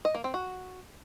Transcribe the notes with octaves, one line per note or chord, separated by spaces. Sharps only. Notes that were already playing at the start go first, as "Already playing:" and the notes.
D#5
A#3
C4
F#4